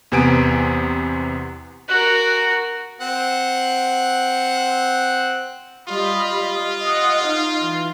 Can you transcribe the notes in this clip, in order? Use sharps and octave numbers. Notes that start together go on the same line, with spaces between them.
E2 C3 B3 G#5 D7
F#4 A#4 F#6
C4 F#5
G3 F4 D#5 B5
D#5 F#5
D#4 F5
E3